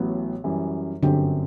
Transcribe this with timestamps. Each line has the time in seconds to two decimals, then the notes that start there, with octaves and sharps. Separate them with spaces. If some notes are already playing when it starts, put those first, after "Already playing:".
Already playing: A1 A2 F#3 B3
0.44 F#2 E3 G3
1.02 G1 F#2 D3 F#3 C4 G4